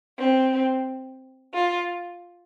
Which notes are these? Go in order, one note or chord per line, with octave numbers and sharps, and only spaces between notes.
C4
F4